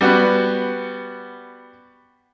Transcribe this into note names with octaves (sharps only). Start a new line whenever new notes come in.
G3 B3 F#4